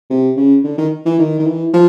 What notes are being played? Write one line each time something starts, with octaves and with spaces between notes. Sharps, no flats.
C3
C#3
D3
D#3
E3
D#3
D#3
E3
F3